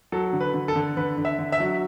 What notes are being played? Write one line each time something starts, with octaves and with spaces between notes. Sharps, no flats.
F#3 A4
D3
B4
D3
A4
D3
D3 B4
D3
E5
D3
E5
F#3